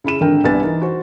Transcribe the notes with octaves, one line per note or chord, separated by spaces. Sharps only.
C#3 E4 B5 E7
G#1 D3 A#4 G5
C2 B3 D4 B4 G#5 A6
E3 D#4 A#4
F#4 C5